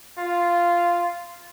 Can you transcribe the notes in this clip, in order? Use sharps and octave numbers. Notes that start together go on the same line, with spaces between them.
F4